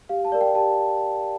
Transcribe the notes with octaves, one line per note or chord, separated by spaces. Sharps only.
G4 F5
A5
A#4 D5
G5
G4 A5